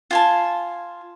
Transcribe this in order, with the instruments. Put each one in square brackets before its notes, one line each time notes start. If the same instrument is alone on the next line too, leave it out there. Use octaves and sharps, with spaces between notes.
[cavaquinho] F4 G#5 A5